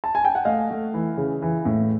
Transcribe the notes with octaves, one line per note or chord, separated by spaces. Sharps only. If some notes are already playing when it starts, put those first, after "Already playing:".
A5
G#5
G5
F#5
A3 D#5 F5
A3
E3
C#3
E3
A2